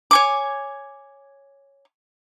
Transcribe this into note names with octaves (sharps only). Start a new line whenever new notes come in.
C#5 G#5 D6